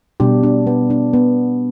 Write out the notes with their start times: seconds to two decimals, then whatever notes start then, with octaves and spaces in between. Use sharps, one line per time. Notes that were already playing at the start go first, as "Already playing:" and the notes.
0.20 B2 G3 D4 G4
0.43 D4
0.67 B3
0.90 D4
1.13 B3